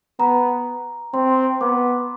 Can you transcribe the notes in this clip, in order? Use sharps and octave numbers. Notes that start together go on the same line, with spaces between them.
B3 A#5
C4 C6
B3 D6